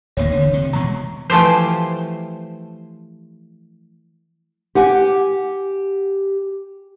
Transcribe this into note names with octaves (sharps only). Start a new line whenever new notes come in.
D1 D#2 A#3 C#5
D3 D#3
C3
B2 E3 G#3 A#5 C#6
E3 F3 A3 G4 C5
G4 F#5 G#5